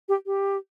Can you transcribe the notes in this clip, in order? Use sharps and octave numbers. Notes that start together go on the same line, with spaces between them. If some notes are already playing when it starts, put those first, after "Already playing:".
G4
G4